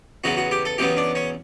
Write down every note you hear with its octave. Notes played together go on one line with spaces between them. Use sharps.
E2 C#3 F#3 B3 F#4
F#4
G4
A4
E2 C#3 F#3 B3 G4
D4
C#4